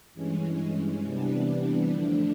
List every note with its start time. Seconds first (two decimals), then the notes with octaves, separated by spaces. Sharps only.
0.13 G2 E3 G#3 C#4
1.02 C3 E3 G3 B3 D4
1.92 F2 D3 F3 A3 D4